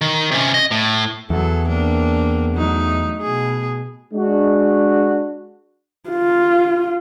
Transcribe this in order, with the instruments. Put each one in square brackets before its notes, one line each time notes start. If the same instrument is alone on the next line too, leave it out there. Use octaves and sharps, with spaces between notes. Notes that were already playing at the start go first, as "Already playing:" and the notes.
[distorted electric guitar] D#3
C3 C#4
D#5
A2
[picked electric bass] E2 [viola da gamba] F#3 A4
[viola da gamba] A#3 C4 D4
F#3 A3 D#4
B2 G#4
[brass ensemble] G#3 D4 F#4
[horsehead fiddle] F4